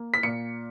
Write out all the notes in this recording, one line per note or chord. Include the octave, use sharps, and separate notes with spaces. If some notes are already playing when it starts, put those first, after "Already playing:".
Already playing: A#3
B6
A#2 C#7